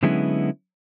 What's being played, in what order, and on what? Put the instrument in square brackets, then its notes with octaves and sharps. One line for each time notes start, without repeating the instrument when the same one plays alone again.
[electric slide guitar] D3 F#3 G#3 B3 C#4 E4